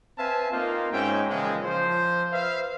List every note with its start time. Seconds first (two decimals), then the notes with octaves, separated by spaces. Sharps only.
0.18 C4 B4 E5 F5 G#5 A5
0.52 A#3 C4 D#4 F4
0.93 G#2 C#4 D#4 E5 G5
1.30 A#2 C#3 E3 F3 G#3
1.63 F3 C5
2.32 B4 C5 E5 F5